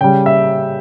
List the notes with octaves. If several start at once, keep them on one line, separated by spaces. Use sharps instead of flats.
C#3 G3 G5
E5